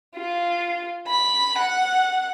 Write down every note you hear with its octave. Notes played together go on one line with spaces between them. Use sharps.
F4
B5
F#5